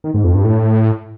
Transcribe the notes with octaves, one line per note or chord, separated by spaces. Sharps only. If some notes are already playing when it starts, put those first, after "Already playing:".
D#3
G#2
F2
G2
A2